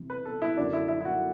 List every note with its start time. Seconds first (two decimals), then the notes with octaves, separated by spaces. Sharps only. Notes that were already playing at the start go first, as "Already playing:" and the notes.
Already playing: C3 E3
0.10 B4
0.25 A4
0.42 E4
0.57 F#2 D3 F#3 D4
0.73 E4
0.88 E4
1.01 E4
1.05 F#4